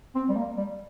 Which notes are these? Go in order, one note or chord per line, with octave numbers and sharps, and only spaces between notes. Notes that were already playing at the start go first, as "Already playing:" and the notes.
C4
G3
A#3
G3